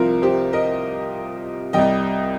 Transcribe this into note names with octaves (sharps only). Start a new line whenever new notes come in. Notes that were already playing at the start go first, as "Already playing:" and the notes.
Already playing: C2 C3 F3 F4 A#4
G4 C5
A#4 D#5
C2 C3 G3 D#5 G5